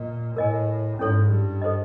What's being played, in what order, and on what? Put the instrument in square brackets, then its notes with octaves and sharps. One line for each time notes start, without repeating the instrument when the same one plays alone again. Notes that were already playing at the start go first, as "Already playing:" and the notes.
Already playing: [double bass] A#2 [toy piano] A#4 D#5
[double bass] A2 [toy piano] A#4 D#5 G#5
[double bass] G#2 [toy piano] C#4 E4 A4 C#5
[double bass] G2
[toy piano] A4 C5 D#5